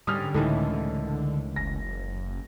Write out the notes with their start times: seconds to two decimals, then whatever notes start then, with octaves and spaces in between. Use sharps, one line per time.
0.07 G#2 D3 G3 C#4 D#6 F6
0.34 C#2 A2 D#3 E3 A4
1.56 F#1 A#6